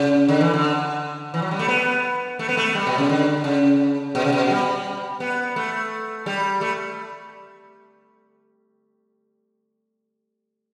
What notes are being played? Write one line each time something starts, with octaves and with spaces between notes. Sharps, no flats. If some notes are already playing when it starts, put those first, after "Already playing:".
Already playing: C#3
D3
E3
D3
E3
F#3
G3
A3
B3
A3
B3
A3
G3
B2
C#3
D3
C#3
B2
C#3
B2
G3
B3
A3
G3
A3